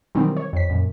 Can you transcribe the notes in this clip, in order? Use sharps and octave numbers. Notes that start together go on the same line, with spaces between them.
B2 D#3 E3 F#3 G3 C4
C#5
F2 B6
F#2 A#2